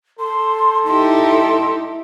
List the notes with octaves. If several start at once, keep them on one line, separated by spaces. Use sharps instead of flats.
A4 C6
D#4 E4 G4 C6